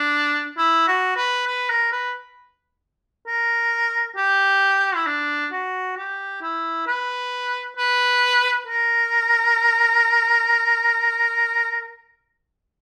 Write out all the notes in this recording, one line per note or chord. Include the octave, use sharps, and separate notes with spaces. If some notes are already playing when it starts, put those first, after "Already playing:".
Already playing: D4
E4
F#4
B4
B4
A#4
B4
A#4
G4
E4
D4
F#4
G4
E4
B4
B4
A#4